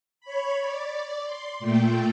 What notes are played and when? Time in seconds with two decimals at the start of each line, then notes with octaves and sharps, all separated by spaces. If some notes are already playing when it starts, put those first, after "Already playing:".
0.20 C#5 B5
0.60 D5
1.25 C6
1.59 A#2 A3 G5